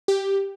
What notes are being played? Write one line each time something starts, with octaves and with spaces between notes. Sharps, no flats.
G4